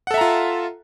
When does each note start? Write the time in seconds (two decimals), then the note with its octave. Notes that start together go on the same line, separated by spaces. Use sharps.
0.07 F#5
0.11 A4
0.14 E5
0.18 A#5
0.21 F4